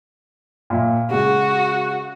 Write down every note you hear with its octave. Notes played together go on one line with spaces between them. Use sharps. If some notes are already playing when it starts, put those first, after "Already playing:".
A#2 E5
C#3 G#3 F#4